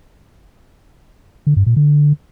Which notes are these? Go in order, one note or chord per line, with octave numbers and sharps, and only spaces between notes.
D3
G2
A#2
D3